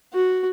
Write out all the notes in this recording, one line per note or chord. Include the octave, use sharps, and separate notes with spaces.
F#4